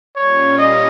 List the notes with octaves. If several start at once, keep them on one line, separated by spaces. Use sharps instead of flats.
A#2 G3 C#4 F4 C#5
D#5